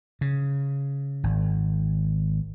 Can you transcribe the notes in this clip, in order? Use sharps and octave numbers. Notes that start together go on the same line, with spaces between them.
C#3
G#1